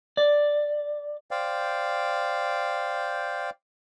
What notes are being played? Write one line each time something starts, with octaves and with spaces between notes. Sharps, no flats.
D5
C5 D5 F5 G5